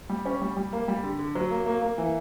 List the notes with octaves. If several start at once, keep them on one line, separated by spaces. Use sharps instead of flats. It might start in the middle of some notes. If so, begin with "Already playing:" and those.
G3
C#4
G3
G3
A#3
G3
D3
D3
F#3
A#3
A#3
A#3
E3